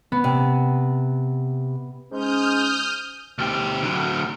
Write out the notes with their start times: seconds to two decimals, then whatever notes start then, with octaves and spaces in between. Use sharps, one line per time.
0.12 B3
0.24 C3
2.11 G#2 G#3 C#4 D#6 F6 G6
3.38 D2 G4
3.83 D3 F#3